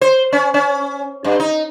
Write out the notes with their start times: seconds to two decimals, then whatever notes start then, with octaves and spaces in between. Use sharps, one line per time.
0.01 C5
0.32 C#4
0.54 C#4
1.24 G2
1.40 D#4